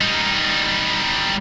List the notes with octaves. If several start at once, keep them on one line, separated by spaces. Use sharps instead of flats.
G3 D#4